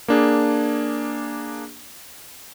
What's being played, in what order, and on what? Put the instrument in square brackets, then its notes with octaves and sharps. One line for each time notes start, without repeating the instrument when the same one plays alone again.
[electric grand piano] A#3 D4 G#4